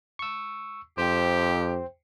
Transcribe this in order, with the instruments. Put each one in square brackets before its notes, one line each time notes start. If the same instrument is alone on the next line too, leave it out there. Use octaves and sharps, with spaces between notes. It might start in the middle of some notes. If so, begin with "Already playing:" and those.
[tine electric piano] C#6 E6
[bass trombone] F2 [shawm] G4 [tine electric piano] C5 G5